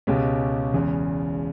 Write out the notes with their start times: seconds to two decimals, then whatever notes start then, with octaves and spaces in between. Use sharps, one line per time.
0.07 C#2 B2 G#3 C#4 G4
0.73 E1 E2 C#3